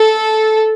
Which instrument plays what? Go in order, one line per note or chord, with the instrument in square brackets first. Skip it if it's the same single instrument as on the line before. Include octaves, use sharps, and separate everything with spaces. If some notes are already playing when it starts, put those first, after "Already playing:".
Already playing: [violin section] A4